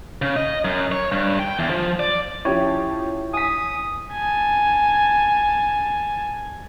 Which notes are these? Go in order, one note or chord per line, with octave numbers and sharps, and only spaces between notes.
C#3
D#5
F#2
C#5
G2
G5
E2
F3
D5
F3 C#4 E4 G4 C#5
G#5 D#6 B6
G#5 A5